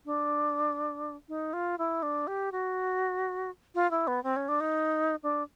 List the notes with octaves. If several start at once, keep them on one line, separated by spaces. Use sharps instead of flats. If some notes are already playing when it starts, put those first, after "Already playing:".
D4
D#4
F4
E4
D4
G4
F#4
F4
E4
B3
C4
C#4
D4
D#4
D4